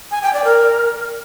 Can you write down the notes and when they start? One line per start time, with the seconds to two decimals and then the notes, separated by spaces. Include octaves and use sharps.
0.11 G#5
0.22 G5
0.33 D5
0.45 A#4